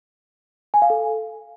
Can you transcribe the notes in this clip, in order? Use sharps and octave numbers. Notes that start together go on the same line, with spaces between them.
G#5
F5
A4